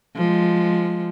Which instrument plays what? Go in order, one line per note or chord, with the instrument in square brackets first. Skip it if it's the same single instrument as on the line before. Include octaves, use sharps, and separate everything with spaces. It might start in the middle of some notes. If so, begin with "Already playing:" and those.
[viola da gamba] F3 G#3